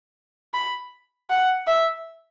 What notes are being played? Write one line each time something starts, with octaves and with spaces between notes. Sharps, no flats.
B5
F#5
E5